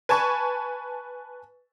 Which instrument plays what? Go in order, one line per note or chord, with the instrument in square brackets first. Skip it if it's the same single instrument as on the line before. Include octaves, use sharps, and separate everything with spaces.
[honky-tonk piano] B4 G#5 A5 C#6